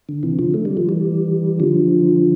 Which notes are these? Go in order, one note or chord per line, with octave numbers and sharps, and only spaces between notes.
D3
C3 E3
D3 F3
A3
G3
F3
E3 G3
D3 F3